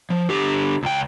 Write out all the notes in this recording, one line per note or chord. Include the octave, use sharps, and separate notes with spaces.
F3
D3 G4
C#2 G5